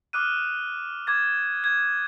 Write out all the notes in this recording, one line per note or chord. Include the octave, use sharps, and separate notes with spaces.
D6 D#6 F6 F#6 D#7
D6 G#6 A6
G#6